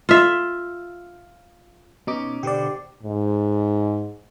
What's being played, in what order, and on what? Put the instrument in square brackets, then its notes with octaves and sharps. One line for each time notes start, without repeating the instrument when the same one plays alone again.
[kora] F4 E5
[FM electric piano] B2 D#4 D6 [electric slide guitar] C#4
[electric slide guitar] B2 D3 C5 [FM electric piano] G4 D5
[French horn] G#2